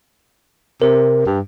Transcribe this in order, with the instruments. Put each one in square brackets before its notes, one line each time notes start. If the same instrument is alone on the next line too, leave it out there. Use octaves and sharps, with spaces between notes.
[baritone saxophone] C3 [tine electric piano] A#4
[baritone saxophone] G2